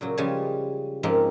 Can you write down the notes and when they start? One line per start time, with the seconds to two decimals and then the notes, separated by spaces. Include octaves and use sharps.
0.01 A#2 C#3 F#3
0.17 C#3 F3 G3 G#3 G#5 A5
1.03 G#2 C#3 F3 G#3 A#3 C4